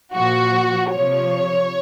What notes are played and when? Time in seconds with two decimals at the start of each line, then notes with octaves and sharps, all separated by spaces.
0.13 A#2 F3 F#4
0.92 C3 F3 C#5